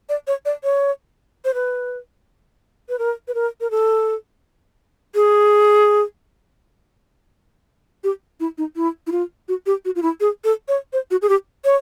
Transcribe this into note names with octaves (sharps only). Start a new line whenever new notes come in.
D5
C#5
D5
C#5
C5
B4
B4
A#4
B4
A#4
A#4
A4
G#4
G4
E4
D#4
E4
E4
F4
F#4
G4
F#4
F4
E4
G#4
A4
C#5
C5
F#4
G#4
G4
C#5